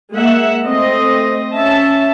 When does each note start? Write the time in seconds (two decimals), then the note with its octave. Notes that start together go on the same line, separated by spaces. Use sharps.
0.12 G#3 A#3 E5 F#5
0.65 A3 C4 D#5
1.56 C#4 E5 A5